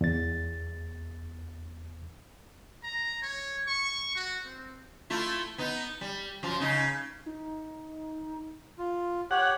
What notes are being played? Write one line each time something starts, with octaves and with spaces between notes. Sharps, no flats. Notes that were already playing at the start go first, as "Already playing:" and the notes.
E2 A6
A#5
C#5
C#6
F#4
C4
A3 E4 F4
B3 D#4
G3
F#2 F3 F4
C#3 D#4
D#4
F4
G4 C#5 F#5